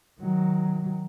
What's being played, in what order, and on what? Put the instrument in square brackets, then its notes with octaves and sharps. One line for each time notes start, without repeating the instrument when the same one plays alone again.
[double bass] D#3 F#3